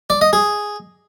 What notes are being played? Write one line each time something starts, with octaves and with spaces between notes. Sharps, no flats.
D5
D#5
G#4